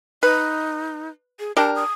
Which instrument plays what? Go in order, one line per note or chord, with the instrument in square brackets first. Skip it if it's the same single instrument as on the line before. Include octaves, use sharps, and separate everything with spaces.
[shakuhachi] D#4 [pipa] B4
[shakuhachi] G#4
[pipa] D4 G4 A#4 [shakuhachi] A5
[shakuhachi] D#6